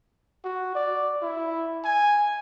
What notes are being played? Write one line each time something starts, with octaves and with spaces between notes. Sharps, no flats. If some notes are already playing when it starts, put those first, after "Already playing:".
F#4
D5
E4
G#5